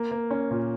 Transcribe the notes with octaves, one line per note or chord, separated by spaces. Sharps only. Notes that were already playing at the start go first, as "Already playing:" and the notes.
Already playing: A#3
A#3
C#4
A#2